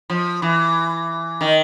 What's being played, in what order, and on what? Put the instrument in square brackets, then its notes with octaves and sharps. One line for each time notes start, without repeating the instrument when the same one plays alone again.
[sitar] F3
E3
D#3